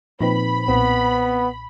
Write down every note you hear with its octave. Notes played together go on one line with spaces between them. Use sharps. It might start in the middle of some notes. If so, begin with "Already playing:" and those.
A#2 F3 C4 D#4 B4 B5
B1 A#2 B3 C4